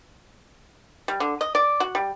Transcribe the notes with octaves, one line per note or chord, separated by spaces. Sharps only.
G3
D3
D#5
D5
F#4
G3